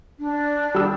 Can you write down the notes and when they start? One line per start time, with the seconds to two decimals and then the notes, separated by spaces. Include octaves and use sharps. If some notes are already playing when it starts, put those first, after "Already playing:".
0.18 D4
0.75 G3 E6